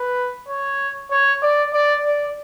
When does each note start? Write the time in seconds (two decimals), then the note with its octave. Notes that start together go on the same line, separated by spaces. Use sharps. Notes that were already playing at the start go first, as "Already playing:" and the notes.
Already playing: B4
0.49 C#5
1.11 C#5
1.42 D5
1.73 D5
2.04 D5